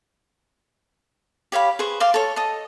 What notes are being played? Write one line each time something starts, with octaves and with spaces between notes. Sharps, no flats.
G4 C#5 F5 B5
G#4 B4 C5 C#6
D5 F5 C6
A4 C#5
A4 D#5